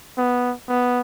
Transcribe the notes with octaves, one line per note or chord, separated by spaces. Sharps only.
B3
B3